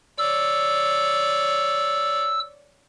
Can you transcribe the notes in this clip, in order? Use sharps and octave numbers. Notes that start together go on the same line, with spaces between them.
C#5 D5 E6